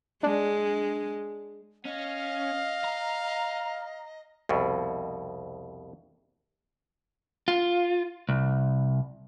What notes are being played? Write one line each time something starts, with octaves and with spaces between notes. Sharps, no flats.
G#3 D4
C#4 D#5 F5
A#5
C2 F2 B2
F4
C2